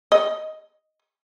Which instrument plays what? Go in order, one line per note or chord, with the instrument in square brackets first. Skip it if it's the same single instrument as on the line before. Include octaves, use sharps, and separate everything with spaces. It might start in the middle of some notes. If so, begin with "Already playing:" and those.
[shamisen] D#5